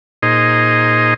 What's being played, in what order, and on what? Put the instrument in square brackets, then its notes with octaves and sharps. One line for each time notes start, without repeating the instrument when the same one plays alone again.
[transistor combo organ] A#2 D#4 G#4 C5 D#5